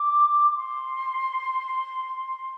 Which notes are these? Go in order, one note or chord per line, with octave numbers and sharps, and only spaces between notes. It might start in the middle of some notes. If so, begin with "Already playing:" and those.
Already playing: D6
C6